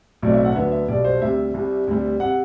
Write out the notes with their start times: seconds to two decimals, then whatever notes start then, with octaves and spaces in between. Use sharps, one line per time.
0.22 B1 A2 F#3 A3 C4 D5
0.34 E5
0.45 F#5
0.55 D2 D3 F#3 B3 E5
0.72 E5
0.88 B1 B2 G3 D5
1.04 C5
1.21 D2 C3 G3 E5
1.54 C2 C3 G3
1.87 D2 C3 G3
2.20 C3 F#5